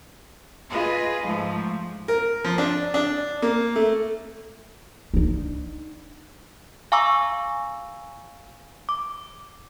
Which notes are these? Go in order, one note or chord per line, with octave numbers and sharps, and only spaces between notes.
F4 G#4 B4 D#5
G#2 F3 A3
A#4
F3
D4
D4
A#3
A3
D4 D#4
F5 G#5 A#5 C#6 D6 E6
D6